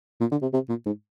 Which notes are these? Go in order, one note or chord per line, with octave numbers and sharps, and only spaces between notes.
A#2
D3
C3
C3
A#2
G#2